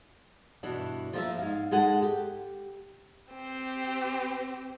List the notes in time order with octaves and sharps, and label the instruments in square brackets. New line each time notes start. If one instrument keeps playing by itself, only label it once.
[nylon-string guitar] G2 B2 E3 D4
F3 A#3 E5
G#2 F5
G#2 G#3 A4 F#5
G4
[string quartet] C4 G4